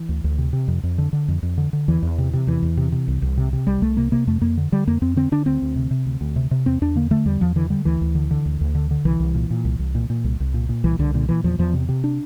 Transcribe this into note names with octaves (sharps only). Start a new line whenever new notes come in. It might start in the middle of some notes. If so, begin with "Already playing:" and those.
Already playing: E3
D2
D2
C3
C3
F2
F2
D3
D3
F2
F2
D3
D3
E2 E3
E2
C3
C3
E2 E3
E2
C3
C3
C2
C2
C3
C3
C2 G3
C2 A3
C3 A#3
C3 A#3
F2 A3
F2 A#3
D3
D3 G3
F2 A#3
F2 C4
D3 C4
D3 D4
D2 C4
D2
C3
C3
D2
D2
C3
C3
E2 C4
E2 D4
D3 A#3
D3 A3
E2 G3
E2 F3
D3 E3
D3 G3
D2 E3
D2
D3
D3
D2
D2
D3
D3
C2 E3
C2
A#2
A#2
C2
C2
A#2
A#2
C2
C2
A#2
A#2
C2 E3
C2 D3
A#2 D3
A#2 E3
E2 F3
E2 F3
C3
C3
D4